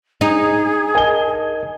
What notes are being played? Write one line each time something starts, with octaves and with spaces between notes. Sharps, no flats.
D#4 G#4
A#4 D#5 G#5 A5 G7